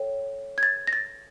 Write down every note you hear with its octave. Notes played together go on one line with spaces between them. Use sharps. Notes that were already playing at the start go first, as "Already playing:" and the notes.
Already playing: A4 C#5 E5 G5
G#6
A6
A#6
A6